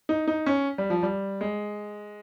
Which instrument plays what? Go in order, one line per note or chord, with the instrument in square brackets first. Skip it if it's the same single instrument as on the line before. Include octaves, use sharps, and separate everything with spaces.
[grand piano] D#4
D#4
C#4
G3
F3
G3
G#3